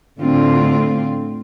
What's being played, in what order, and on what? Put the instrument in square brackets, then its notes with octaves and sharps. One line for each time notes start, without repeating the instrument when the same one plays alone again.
[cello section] A2 D3 C4 F4